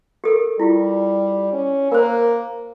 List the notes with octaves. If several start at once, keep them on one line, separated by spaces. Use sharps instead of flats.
G4 A4 A#4
G3 E4 F4 G4
C#4
A#3 A#4 C5